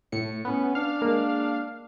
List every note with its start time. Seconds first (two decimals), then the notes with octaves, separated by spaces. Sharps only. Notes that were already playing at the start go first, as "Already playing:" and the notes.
0.12 A2 C#7
0.45 B3 C#4
0.75 D4 F5
1.02 G#3 A#3